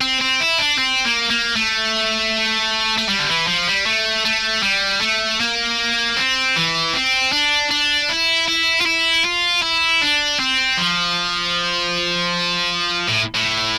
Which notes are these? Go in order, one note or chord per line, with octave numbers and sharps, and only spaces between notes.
C4
C4
E4
D4
C4
A#3
A#3
A3
A3
G3
D3
E3
F3
G3
A3
A3
G3
A3
A#3
C4
E3
C4
D4
D4
E4
E4
F4
E4
F4
E4
D4
C4
F3
A2
A2